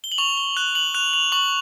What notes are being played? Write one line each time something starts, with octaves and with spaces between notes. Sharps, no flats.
G7
F#7
C#6 F7
G7
F#6 F#7
F#7
F#6 F7
F7
C#6 F#7